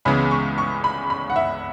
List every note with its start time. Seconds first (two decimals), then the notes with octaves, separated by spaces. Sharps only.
0.05 C#2 C#3 E3 G#3 B3 B5
0.31 C#6
0.58 C#6
0.84 B5
1.10 B5
1.30 F#5
1.36 E5